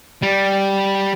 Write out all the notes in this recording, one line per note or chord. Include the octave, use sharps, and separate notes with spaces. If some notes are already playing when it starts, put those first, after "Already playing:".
G3